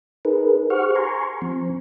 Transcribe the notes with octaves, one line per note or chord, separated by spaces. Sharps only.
D#4 G#4 A#4 B4
G4 G#4 C5 F#5 C#6 F6
G#5 A#5 C6 C#6
F3 C4